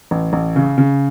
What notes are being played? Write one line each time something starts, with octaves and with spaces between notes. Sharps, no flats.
A1
A1
C#3
C#3